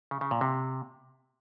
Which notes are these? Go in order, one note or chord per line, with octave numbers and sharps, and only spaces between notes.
C#3
C#3
A#2
C3